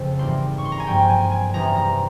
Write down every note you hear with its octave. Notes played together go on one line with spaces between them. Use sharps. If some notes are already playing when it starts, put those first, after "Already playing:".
Already playing: F2 C#3 C4
G#2 E3 G3 A#3 C6
C#6
C6
A#5
G#5
G2 F3 A#3 G5
G#5
G#5
E2 C3 E3 G3 A#5
A#5